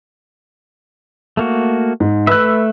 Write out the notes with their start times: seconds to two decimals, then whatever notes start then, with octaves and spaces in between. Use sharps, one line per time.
1.37 A3 A#3 F#4
2.00 G#2
2.27 A3 B4 E5 E6 F#6